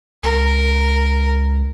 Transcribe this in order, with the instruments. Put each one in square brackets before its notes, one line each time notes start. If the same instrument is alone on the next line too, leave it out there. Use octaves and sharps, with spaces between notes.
[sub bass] C#2 [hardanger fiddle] A#4